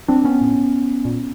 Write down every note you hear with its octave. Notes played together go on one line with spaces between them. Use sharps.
C4 D4
B3 C#4
A2
A#2